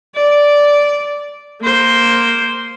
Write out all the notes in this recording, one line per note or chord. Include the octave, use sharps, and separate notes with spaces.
D5
A#3 C5